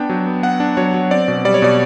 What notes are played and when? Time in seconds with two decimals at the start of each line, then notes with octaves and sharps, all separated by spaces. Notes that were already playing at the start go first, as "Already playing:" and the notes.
Already playing: B3 D4 G5
0.09 F#3
0.26 B3
0.43 B3 F#5
0.60 D4
0.77 F#3 C#5
0.94 F#3
1.11 C4 D5
1.28 B2
1.45 G3 D5
1.54 C#5
1.62 B2 D5